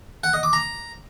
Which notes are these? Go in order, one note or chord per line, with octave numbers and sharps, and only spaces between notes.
F#5
D#5
D6
A#5